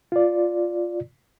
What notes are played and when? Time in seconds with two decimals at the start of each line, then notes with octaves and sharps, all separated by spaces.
0.12 F4 D5